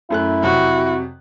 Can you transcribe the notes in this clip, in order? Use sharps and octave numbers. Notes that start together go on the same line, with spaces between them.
F#2 A3 E4 F#6
F2 C3 F#3 F#4